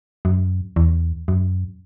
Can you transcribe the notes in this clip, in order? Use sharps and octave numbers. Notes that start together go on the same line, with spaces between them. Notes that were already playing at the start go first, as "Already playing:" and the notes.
F#2
E2
F#2